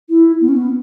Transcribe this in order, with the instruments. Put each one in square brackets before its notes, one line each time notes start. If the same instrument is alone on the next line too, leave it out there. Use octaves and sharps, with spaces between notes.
[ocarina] E4
B3
C#4
B3